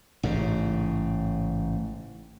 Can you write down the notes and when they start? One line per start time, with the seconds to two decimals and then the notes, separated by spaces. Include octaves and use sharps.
0.23 A1 G#2 C#3